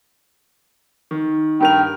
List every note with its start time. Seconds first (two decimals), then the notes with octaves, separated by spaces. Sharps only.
1.11 D#3
1.60 G2 A#4 G5 F7